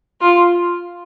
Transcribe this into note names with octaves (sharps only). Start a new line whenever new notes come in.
F4